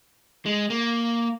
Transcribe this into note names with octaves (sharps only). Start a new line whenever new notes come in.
G#3
A#3